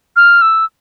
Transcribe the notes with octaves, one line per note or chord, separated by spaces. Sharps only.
F6
E6